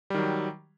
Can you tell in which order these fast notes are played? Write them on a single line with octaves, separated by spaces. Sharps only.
G3 D#3 F#3